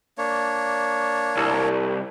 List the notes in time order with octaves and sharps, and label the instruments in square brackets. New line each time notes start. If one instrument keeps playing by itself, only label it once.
[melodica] A#3 D4 C#5
[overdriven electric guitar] C2